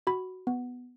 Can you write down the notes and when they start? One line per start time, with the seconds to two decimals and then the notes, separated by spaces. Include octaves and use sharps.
0.07 F#4 B5
0.47 B3